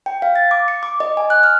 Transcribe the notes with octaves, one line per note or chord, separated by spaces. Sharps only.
G5
F5
A6
D6
C#7
D6
D#5
G#5
F#6
F6